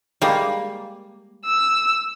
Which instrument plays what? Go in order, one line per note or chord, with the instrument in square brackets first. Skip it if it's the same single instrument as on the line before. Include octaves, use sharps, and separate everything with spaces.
[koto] G3 G#3 A#3
[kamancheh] E6